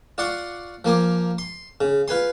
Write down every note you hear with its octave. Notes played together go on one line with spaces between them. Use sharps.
F4 D5 F#5 C6 C#6
F3 A#3 G#5 D6
C6
C#3
F4 B4 G#5 C6